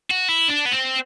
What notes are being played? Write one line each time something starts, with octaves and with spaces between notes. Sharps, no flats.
F#4
E4
D4
B3
C4